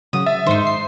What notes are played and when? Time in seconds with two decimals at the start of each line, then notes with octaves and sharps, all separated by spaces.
0.13 C#3 F#3 F#4 D#6
0.26 E5 A5
0.46 G#2 D#3 D#4 C5
0.67 C7